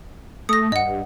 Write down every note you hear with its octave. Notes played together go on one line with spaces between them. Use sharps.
A3 D#6 A#6
G2 D#5 F#5